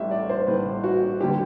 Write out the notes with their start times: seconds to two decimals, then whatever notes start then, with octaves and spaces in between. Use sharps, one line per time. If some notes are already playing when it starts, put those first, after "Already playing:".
Already playing: A1 A2 G3 E5
0.11 D5
0.30 C5
0.47 A1 A2 G3 B4
0.84 F#4
1.21 D3 G3 G4